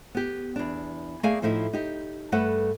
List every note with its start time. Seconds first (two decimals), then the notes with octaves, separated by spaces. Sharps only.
0.15 B3 G4
0.56 E2 D4
1.23 A3 A#3 G#4 D5 F5 G#5
1.42 A2 F3 A3 D#4 E4
1.73 D#4 G4
2.32 G2 A3 A4 B4 F#5